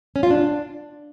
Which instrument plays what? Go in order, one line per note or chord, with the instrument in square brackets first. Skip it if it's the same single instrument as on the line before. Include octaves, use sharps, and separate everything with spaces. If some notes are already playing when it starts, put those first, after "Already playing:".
[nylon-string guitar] C#4
F4
D4